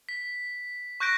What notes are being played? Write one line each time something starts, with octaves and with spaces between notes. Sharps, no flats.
B6
C#6 F#6 G6 A#6 D7